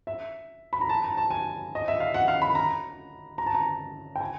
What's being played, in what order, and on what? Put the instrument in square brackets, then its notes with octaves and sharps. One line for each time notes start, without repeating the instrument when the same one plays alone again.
[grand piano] E5
B5
A#5
A5
A#5
A5
G#5
D#5
E5
F5
F#5
F5
B5
A#5
A#5
A5
A#5
G5
G#5